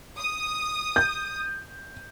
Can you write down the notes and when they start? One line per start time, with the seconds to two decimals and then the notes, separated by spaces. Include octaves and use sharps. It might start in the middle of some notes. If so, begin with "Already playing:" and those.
0.17 D#6
0.96 G6